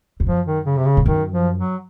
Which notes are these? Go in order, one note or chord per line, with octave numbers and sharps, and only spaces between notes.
F2
F#2 F3
D#3
C#3
C3
C#3
G#2
F#2 D#3
F3
F#3